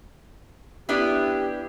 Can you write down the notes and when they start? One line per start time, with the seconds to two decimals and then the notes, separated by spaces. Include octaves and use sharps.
0.89 B3 D4 E4 G4